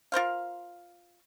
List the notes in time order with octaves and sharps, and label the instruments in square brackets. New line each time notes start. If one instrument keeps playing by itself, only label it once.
[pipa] F4 A#4 C5 F5